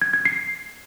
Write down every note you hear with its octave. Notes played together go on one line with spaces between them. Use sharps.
G#6
G#6
C7